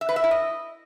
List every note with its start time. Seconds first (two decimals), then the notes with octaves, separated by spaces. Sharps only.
0.01 E5
0.09 B4
0.16 E5
0.24 E4
0.31 D#5